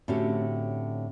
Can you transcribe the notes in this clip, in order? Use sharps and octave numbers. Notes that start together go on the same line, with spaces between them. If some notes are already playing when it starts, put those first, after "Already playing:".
A2 D3 C4 C#4 F#4 G4